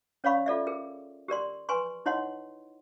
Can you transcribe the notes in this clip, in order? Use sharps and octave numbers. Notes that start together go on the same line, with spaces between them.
C#4 C#5 D5 F5 B5 C#6
F4 A4 D5 E5
G#4 A#4
G4 A#4 D5 C6
B4 G#5 C6 C#6
D#4 E4 C#5 D#5 F#5 C6